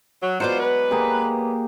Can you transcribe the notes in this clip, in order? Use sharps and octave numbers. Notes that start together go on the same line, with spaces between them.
F#3
F#3 G#3 B3 F4 C5 D5 F#5
B4
A#3 G4 G#4